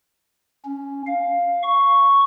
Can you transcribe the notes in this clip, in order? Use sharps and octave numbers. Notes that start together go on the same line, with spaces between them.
C#4
F5
C#6